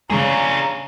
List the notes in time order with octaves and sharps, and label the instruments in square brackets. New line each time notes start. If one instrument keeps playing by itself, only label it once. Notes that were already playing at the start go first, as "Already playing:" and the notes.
[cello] C#3 [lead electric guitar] D4 G#4 [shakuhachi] A#5